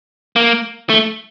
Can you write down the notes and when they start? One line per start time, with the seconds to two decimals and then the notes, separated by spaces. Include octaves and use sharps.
0.36 A#3
0.89 A3